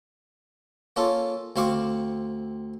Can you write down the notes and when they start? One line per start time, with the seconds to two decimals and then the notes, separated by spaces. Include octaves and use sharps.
0.96 A#3 C#4 F4 A4
1.56 D2 C4 F5 C#6 D6